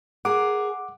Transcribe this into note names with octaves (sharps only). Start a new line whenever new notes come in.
G#4 A#4 F#5 D6